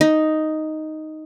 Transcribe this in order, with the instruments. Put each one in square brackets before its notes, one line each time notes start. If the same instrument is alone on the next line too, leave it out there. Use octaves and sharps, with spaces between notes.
[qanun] D#4